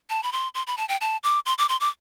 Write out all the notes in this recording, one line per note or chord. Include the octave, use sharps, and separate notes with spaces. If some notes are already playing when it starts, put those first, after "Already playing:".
A5
B5
C6
C6
B5
A5
G5
A5
D6
C6
D6
C6
D6